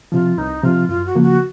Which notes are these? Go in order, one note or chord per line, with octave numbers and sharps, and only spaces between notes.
C3 F3 F4
C2 D#4
C3 F3 F4
F#2 F4
F#4
C#3 F3 A#3
F#4